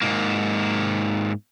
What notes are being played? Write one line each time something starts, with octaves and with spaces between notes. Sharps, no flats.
G#2 A#3